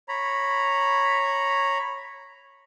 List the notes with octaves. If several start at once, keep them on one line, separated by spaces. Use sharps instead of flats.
C#5 A#5 B5